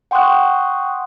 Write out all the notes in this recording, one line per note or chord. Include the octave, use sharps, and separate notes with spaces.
F#5 G5 C6 C#6 D#6 F#6